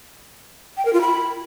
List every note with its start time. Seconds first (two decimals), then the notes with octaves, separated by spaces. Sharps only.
0.77 G5
0.85 A#4
0.93 F4
1.01 B5